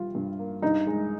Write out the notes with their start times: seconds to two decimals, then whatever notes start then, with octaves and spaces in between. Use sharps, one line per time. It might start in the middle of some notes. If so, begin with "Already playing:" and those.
Already playing: G3 F4
0.15 G2
0.39 A#3
0.62 G2 D#4
0.87 G#3